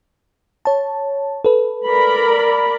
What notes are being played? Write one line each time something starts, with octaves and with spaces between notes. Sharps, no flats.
C#5 A5
A4 B4
A#4 D5 B5